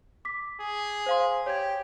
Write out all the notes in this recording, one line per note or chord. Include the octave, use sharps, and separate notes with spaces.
D6 B6
G#4
C5 F5 C6
G4 C#5 G#6